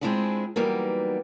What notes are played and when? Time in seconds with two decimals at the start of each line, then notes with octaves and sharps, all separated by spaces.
0.01 G#3 C4 D4 E4 F4 G#4
0.56 E3 F#3 G3 A#3 B3 D#4